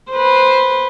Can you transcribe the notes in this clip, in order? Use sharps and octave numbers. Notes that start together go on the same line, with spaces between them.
B4 C5